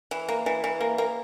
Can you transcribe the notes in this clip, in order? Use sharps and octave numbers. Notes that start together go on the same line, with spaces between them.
E3
A#3
E3
E3
A#3
A#3